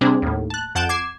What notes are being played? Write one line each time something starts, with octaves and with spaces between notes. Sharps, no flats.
C3 G3 C4 D4 G#4 C5
D#2 A2
A5 F#6
F2 F#5 A5 G6 D7 E7
D6 G#6 C7 E7